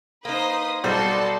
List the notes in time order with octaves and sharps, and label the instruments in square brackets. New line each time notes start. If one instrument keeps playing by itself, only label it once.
[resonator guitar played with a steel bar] A#3 D#4 [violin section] B4 C5 D#6
[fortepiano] B1 G3 C5 [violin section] F#4 A4 C6 [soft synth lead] D5